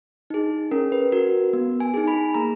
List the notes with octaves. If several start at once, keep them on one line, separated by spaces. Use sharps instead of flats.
D#4 G#4
C#4 A#4
B4
F#4 A#4
B3
G#5
D#4 G#4
B5
A#3 A#5